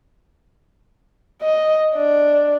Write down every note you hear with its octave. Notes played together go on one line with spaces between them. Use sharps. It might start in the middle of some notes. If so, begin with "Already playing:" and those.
D#5
D4